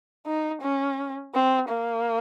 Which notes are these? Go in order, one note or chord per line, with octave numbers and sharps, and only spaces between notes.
D#4
C#4
C4
A#3